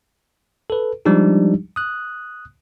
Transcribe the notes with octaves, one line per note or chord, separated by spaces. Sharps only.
A4 B4
F3 G3 G#3 D4 D#4 G4
D#6 F#6